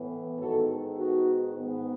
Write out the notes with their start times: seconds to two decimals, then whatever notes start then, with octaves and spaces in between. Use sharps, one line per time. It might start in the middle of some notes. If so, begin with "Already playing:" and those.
Already playing: A2 E3 B3
0.39 G#2 D#3 G#3 B3 F#4 A4
0.98 D#4 F#4
1.55 G#2 D#3 G#3 B3